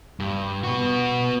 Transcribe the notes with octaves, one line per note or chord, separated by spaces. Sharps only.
G2
B3 F#4